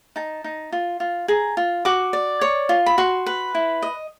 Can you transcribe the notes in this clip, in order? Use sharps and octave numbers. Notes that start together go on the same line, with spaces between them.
D#4 A5
D#4
F4
F4
G#4 A#5
F4
F#4 D6
D5
C#5
F4
B5
F#4 C6
B4
E4
D#5